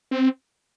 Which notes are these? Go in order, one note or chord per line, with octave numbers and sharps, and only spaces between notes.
C4